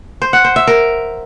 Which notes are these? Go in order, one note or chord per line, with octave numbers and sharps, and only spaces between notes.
C5
F#5
C5
E5
A#4